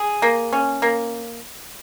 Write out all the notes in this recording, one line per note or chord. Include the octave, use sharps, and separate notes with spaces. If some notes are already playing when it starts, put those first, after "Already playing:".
Already playing: G#4
A#3
C#4
A#3